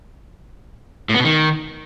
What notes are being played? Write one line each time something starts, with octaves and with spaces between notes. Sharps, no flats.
A2
B3
B2
D#3